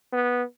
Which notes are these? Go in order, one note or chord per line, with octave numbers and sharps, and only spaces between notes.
B3